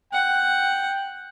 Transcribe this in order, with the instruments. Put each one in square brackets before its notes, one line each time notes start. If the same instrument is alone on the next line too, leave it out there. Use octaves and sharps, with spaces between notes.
[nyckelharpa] F#5 [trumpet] G5